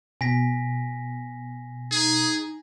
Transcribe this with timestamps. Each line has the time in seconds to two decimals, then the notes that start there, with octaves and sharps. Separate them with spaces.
0.21 B2 G#5 A#6 B6
1.92 D#4 G#4